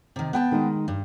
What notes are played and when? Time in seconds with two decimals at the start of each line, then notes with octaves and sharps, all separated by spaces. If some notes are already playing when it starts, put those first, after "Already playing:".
0.16 C3 D#3
0.33 B3 G5 A5
0.52 D#3 G#3 D#4
0.88 G2